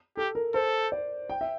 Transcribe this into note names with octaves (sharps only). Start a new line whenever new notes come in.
G4 A4
A#4
A4 C5
D5
G5
E5